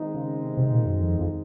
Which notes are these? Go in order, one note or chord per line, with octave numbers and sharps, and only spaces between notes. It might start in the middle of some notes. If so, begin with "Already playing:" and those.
Already playing: D#3 G#3 C4 D#4
C#3
C3
C3
A#2
F#2
F2
F2